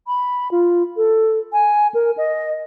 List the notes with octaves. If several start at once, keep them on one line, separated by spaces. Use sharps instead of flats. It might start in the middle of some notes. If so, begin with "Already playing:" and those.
B5
F4
A4
G#5
A#4
D#5